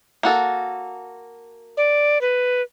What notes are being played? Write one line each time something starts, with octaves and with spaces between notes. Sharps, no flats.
A#3 F#4 A4
D5
B4